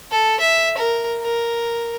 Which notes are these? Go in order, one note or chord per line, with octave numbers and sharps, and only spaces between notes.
A4
E5
A#4
A#4